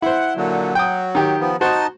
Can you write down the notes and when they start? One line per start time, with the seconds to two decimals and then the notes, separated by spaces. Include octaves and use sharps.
0.02 E4 C5 F#5
0.36 A#2 D3 F#3
0.75 F#3 G5 D#6
1.15 D#3 G4
1.40 F3 B3
1.61 D#4 F#4 C5 A5